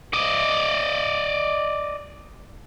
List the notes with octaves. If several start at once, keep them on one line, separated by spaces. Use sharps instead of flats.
D5 D#5